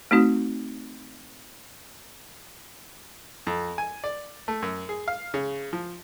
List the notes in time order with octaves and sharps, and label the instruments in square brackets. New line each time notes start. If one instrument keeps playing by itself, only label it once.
[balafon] A3 C4 D#4 F#4
[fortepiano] F2
G#5
D5
A3
F#2
G#4
F5
C#3
F3